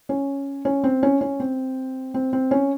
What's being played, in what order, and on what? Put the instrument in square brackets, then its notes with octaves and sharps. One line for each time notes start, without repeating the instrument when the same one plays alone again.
[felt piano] C#4
C#4
C4
C#4
C#4
C4
C4
C4
C#4